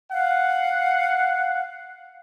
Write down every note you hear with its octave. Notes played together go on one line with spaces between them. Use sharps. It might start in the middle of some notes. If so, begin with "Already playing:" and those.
F5 F#5